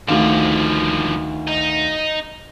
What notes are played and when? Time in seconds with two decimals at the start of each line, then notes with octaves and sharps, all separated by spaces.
0.08 D2 D3 D#3 F3 F5
1.48 D#4